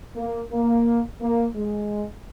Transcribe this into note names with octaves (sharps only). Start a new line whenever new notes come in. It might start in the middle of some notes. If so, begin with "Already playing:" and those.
A#3
A#3
A#3
G#3